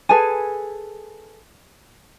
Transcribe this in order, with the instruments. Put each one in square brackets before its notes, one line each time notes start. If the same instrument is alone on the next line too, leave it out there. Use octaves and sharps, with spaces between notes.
[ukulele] G#4 A4 B4 G#5